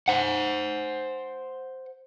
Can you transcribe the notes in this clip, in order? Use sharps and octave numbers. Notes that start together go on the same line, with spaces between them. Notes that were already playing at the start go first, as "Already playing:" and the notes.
C5 F#5